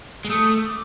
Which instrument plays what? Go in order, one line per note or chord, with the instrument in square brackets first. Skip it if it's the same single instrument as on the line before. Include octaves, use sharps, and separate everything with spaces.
[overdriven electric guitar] G#3
[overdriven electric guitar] A3 [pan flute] D#6
[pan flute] D6